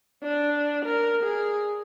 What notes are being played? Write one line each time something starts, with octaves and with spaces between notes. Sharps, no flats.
D4
A#4
G#4